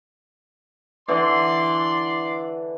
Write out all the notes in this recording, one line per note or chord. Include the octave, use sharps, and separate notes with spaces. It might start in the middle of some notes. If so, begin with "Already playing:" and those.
D3 E3 D5 C6